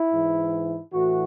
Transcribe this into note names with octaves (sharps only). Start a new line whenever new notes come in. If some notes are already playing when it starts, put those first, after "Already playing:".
Already playing: E4
G#2 E3
A2 E3 F#4